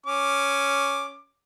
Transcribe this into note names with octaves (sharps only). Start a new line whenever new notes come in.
C#4 D6